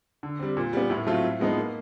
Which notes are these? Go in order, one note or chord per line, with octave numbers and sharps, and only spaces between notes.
D3
G3 C4
A#2
G3 B3
A2
F#3 A3 C4 F4
A2
F3 G#3 B3 D#4
A#3